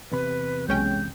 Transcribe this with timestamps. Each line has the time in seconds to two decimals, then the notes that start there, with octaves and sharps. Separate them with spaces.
0.12 E2 C3 B4 B5
0.68 B1 G#3 C#4 G5 G6